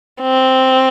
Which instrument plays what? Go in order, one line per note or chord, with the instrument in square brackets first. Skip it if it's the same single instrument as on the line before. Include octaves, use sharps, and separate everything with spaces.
[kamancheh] C4